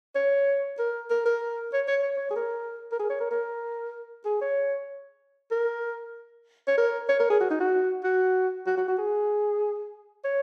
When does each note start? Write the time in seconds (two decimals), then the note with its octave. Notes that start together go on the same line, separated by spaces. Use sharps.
0.15 C#5
0.79 A#4
1.10 A#4
1.26 A#4
1.73 C#5
1.88 C#5
2.02 C#5
2.16 C#5
2.30 G#4
2.36 A#4
2.92 A#4
2.99 G#4
3.09 C#5
3.20 A#4
3.31 A#4
4.25 G#4
4.41 C#5
5.51 A#4
6.67 C#5
6.77 A#4
7.09 C#5
7.19 A#4
7.30 G#4
7.40 F#4
7.50 D#4
7.60 F#4
8.04 F#4
8.67 F#4
8.77 F#4
8.88 F#4
8.98 G#4
10.24 C#5